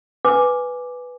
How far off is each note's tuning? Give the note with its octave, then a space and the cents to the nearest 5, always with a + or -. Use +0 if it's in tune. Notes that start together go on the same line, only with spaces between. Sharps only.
B4 +0 G#5 +0 D6 +0